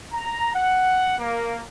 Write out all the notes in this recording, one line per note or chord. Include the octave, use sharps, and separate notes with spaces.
A#5
F#5
A#3